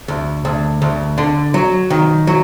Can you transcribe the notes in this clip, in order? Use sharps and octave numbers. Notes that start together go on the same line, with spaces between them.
D2
D2
D2
D3
F#3
D#3
F#3